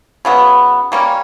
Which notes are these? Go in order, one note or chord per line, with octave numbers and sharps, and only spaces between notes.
C#3 F#3 B3
G3 A#3 C#4